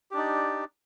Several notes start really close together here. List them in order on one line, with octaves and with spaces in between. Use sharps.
G4 D4 D#4 D5